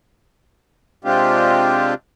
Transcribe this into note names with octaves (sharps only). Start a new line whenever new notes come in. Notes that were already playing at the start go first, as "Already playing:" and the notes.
C3 G#3 C4 D4 F4 G4